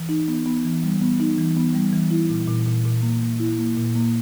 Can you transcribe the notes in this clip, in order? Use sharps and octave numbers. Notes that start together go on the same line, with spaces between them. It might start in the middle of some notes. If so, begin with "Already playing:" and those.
Already playing: E3
D#4
B3
B3
E3
G3
B3
D#4
E3
B3
G3
E3
E4
A#2
A#2
A#2
A#2
A#3
A#3
E4
A#3
A#2
A#3